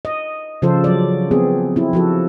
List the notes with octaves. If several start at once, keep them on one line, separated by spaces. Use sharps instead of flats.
D#5
C#3 F3 F4 A4 C5
F#3 D5
B3 C4 G#4
C4 E4
F3 F#4 A4